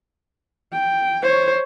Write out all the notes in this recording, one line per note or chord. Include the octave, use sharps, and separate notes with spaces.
G5
C5 C#5